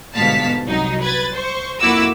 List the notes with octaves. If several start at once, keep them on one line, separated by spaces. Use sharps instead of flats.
G1 G#2 B2 F5 A5 B6
C2 F#3 D#4
B4 G#6 A6
C5 C#6
F2 A#3 E4 F#4 D6 E6